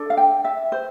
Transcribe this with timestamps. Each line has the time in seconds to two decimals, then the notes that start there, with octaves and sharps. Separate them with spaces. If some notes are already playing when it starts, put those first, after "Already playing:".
Already playing: D4 A4
0.10 F5
0.17 G5
0.44 E5
0.72 C5